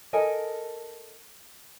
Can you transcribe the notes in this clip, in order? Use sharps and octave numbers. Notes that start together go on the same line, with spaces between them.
A4 A#4 D#5 G#5